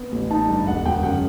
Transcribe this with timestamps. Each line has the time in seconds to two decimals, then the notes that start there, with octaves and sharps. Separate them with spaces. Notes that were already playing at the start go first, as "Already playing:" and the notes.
Already playing: B3
0.12 A1
0.30 D#4 A5
0.49 G2
0.67 E1 F#5
0.85 E1 G5
1.03 F#2 F#5